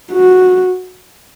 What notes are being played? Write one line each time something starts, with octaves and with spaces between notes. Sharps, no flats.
F#4